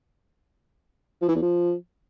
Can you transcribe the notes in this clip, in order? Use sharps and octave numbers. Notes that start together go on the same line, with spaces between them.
F3
E3
E2
F3